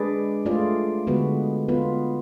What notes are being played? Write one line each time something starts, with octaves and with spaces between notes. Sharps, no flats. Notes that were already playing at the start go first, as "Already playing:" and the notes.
Already playing: G#3 D4 G#4 B4 D5
A3 F4 G#4 D5
D3 G#3 B3 F#4 B4
B3 F4 B4